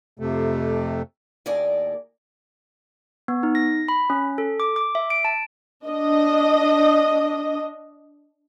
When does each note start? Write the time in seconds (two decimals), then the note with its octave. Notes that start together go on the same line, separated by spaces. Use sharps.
0.19 F2 C3 A3
1.46 D#2 A2 G#4 A#4 D5
3.28 B3
3.43 D#4
3.55 A#6
3.88 B5
4.10 C#4
4.38 A4
4.60 D6
4.76 D6
4.95 E5
5.10 D7
5.25 A5
5.87 D4 D#5